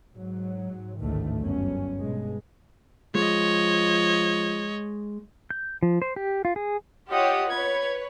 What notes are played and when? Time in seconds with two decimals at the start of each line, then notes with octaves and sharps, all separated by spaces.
0.13 G#2 F#3
1.01 A1 D2 G#2 D#3 A3
1.39 G1 F#2 C#4
1.99 G2 B2 G#3
3.15 F3 G#3 C#5 D#5
5.50 G6
5.83 F3
6.02 C5
6.16 G4
6.45 F4
6.56 G#4
7.10 F4 G4 C#5 D#5 F#5 D#6
7.50 B4 C#5 G#6